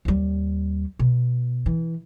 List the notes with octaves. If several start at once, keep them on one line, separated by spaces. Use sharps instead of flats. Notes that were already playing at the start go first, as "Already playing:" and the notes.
D#2 G3
B2
E3